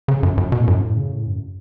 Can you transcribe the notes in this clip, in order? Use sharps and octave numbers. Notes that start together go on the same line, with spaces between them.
C#3
F#2
F#2
B2
A2
F#2
A2
C#3
A2
F#2